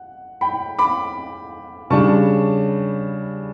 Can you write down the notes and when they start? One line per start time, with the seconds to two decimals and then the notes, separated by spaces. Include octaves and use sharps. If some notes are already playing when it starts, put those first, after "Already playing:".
Already playing: F#5
0.41 G5 B5
0.79 B5 D6
1.90 C#3 G3 D4 A5 C#6